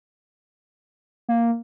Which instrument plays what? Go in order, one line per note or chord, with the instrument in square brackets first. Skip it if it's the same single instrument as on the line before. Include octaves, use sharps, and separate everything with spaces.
[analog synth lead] A#3